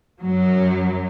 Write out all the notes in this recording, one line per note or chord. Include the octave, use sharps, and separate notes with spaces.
F#2 F#3